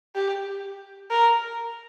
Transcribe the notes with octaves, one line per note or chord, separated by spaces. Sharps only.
G4
A#4